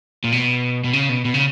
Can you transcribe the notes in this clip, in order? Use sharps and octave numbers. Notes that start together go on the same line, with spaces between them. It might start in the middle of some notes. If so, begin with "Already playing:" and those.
A#2
B2
B2
C#3
B2
B2
C#3